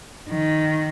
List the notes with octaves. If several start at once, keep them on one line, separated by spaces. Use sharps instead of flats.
D#3